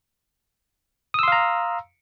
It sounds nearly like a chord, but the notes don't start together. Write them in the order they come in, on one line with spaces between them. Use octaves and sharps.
D#6 E6 C6 F5 A#5